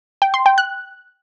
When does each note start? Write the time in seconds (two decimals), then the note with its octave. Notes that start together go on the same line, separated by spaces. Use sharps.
0.22 G5
0.34 C6
0.46 G5
0.58 F#6